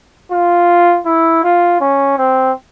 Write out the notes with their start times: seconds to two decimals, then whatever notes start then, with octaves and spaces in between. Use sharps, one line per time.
0.32 F4
1.06 E4
1.43 F4
1.81 C#4
2.18 C4